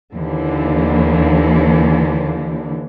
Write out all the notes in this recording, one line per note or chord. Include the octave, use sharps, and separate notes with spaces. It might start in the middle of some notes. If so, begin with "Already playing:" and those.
D#2 D3 E3